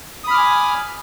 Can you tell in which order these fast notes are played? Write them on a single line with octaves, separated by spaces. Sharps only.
D#6 B5 F6 D6 G#5